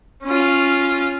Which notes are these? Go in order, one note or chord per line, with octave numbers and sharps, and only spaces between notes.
C#4 F4